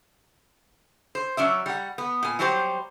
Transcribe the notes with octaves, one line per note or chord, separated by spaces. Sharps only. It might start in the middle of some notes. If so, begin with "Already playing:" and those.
C5
F#3 C#4 D5 E5
G3 F#5
B3
A#2 G#5
F#3 G3 F#4 G4 A4 C5